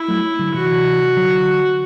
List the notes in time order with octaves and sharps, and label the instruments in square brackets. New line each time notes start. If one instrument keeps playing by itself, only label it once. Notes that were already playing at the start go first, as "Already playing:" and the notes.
Already playing: [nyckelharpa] E4
[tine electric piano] F#3 A3
D3 F#3
[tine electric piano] C3 E3 [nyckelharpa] F#4
[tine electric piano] D3 F#3